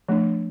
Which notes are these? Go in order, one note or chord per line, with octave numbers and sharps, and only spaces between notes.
F3 A3 D4